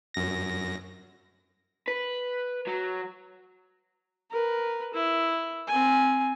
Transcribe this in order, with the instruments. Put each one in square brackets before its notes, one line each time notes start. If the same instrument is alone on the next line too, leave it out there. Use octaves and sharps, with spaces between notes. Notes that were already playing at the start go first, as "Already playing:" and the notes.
[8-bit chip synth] F#2 A#6
[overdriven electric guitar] B4
F#3
[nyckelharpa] A#4 B4
E4
C4 G#5